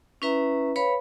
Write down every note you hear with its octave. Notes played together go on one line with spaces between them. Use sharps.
C#4 E4 B4 E5 A#5
B4 C#5 F5 B5